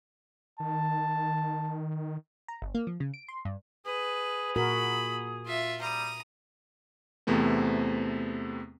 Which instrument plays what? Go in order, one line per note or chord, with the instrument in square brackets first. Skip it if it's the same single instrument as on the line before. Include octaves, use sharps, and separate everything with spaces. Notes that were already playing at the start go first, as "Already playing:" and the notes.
[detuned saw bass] D#3 [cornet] A5
[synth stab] A#5
G1
A#3
F3
C#3
D7
C6
G2
[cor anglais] G#4 [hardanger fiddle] B4
[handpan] A#2 F#4 A#4 [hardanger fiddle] B5
[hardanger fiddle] F4 E5
[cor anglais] G3 [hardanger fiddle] A#5 D#6
[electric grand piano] E2 C3 A3 B3 C4